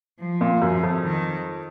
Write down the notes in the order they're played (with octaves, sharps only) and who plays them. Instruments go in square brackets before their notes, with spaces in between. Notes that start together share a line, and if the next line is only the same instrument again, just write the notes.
[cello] F3
[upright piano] A#2
[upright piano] F#2 [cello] F3
[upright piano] F2
[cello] D#3